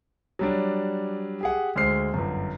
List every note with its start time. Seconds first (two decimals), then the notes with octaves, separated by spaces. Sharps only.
0.39 F#3 G3 D4
1.41 G4 G#4 F#5
1.76 D2 G#3 C5 F6 C7
2.14 G1 F#2